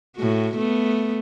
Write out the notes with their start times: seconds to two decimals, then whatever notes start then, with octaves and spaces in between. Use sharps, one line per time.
0.16 A2 F#4
0.57 A3 B3